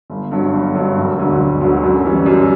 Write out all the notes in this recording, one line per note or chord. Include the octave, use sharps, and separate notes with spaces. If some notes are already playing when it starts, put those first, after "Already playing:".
G1
G2 F#3
G1
G2 F#3
E1
D2 D3 F#3
E1
D2 D3 F#3
F#2
E3 G3 C#4
F#2